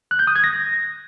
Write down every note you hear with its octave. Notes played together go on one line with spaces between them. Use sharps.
F#6
G6
D#6
G#6
A#6